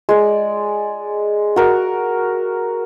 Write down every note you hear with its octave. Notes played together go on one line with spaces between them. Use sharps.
G#3 D5
F#4 A#4